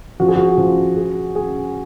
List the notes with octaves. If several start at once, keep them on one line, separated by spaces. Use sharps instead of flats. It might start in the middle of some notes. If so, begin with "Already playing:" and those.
F3 F#4
G#4
F#4
F3
G#4
G#4